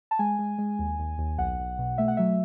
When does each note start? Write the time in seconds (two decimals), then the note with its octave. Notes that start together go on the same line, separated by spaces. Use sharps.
0.11 A5
0.19 G#3 G#5
0.39 G#3
0.58 G#3
0.79 D#2
0.99 D#2
1.18 D#2
1.38 B1 F#5
1.59 B1
1.79 B2
1.98 A3 E5
2.08 F#5
2.17 F#3 E5